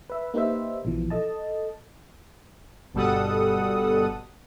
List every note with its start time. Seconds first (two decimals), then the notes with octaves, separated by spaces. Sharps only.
0.10 B4 E5
0.34 A#3 D#4 G4 B4 C5 E5
0.85 A#1 B2 E3 F3
1.10 A4 D#5 A5
2.93 G1 B2 G3 A4 F#5 D#6